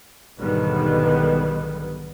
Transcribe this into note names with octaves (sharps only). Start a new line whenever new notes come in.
B1 G#2 D3 D#3 G3 B3